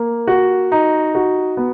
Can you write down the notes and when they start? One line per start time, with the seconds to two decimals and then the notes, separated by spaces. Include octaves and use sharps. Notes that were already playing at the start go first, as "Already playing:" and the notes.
Already playing: A#3
0.28 F#4
0.72 D#4
1.15 F#4
1.57 B3